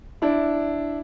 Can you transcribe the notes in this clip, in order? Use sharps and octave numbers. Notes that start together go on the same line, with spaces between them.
D4 E4